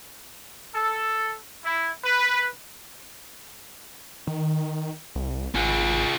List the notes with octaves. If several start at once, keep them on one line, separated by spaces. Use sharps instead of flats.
A4
E4
B4
D#3
C2
G#1 F4 G#4